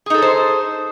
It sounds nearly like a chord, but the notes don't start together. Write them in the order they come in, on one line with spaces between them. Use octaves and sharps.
G#4 D#4 A4 C#5 C5